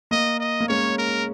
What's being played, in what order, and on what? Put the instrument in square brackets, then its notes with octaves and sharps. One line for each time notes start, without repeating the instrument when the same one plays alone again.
[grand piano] A#3 [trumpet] D#5
[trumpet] D#5
[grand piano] A#3
[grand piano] G#3 C#4 [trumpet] C#5
[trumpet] A#4